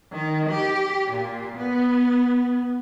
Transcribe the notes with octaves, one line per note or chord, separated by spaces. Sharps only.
D#3
G4
A#2
B3